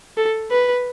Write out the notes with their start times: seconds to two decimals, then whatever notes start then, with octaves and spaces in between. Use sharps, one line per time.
0.17 A4
0.51 B4